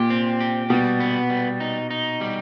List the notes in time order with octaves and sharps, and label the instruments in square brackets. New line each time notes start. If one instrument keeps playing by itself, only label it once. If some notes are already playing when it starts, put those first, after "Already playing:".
Already playing: [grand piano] A#2 [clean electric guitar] G4
[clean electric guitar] C4
G4
[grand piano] B2 [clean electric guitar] G3
[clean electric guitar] B3
G3
D#4
D#4
G3